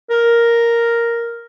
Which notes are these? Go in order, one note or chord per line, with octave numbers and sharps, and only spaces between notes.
A#4